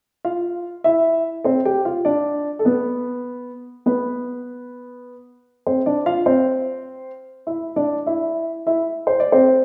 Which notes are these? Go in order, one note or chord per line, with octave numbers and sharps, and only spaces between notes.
F4 F5
E4 E5
C4 C5
G4 G5
F4 F5
D4 D5
A4
B3 B4
B3 B4
C4 C5
D4 D5
F4 F5
C4 C5
E4 E5
D4 D5
E4 E5
E4 E5
C5
D5
C4 C5